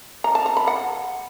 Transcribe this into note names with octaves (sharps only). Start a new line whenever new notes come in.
A#5
A5
A#5
B5
F#5